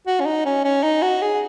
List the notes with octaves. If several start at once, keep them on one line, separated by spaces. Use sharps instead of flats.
F#4
C#4
D#4
C#4
C#4
D#4
F#4
G#4